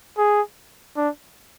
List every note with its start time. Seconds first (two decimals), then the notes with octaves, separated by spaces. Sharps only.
0.18 G#4
0.97 D4